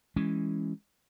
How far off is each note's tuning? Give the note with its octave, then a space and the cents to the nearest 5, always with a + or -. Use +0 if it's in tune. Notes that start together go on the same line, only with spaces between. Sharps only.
E3 +0 G#3 +0 C#4 -5